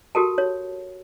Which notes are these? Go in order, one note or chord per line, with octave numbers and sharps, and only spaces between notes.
F#4 G4 A4 A#4 A5
C#5